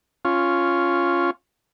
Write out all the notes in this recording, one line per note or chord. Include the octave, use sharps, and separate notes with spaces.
C#4 F4